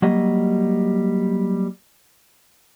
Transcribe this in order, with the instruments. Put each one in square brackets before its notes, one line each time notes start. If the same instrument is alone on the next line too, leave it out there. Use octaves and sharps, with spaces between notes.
[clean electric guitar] F#3 G3 A#3 D#5